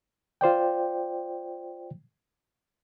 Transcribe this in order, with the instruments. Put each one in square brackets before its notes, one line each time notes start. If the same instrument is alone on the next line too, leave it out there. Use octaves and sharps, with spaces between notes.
[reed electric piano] F4 C5 D5 G5